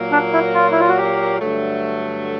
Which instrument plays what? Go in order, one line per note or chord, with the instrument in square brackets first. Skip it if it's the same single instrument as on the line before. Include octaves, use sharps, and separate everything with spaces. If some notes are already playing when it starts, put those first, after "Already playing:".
Already playing: [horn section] A#2 F#3 A#3
[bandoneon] D4
E4
F4
E4
F4
F#4
G4
[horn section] G2 D3 F#3 A3